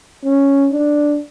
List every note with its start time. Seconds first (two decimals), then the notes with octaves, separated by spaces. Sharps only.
0.24 C#4
0.73 D4